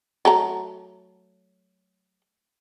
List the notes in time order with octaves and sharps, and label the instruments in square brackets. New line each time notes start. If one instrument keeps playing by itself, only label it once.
[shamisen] F#3 A3 A#5